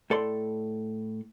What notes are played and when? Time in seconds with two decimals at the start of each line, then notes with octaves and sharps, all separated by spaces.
0.10 A2 A4 D5 C6